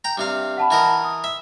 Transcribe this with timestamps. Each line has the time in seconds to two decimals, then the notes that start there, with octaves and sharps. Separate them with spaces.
0.04 G5 A#5
0.18 G2 C3 F5
0.57 F#5 A5 B5
0.71 E3 A#4 D#5
1.04 D#6
1.24 E5